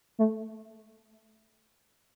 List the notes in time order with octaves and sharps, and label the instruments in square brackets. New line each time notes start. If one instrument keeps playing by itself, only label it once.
[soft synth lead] A3